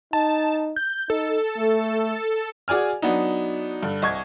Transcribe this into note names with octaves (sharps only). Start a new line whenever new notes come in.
D#4 A5
G6
D#4 A4
A3
F#4 G#4 D5 G#5 F6
F#3 B3 D4 D#4
G2 D3
C2 D#5 C#6 G#6